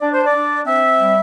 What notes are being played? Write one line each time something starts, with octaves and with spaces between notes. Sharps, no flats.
D4 D5
C5
D5
D4
C4 E5
G3